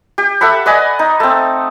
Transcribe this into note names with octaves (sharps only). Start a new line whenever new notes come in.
G4
A4 E5 F#5 B5
B4 D5 D#5 G#5
D#4
A3 C4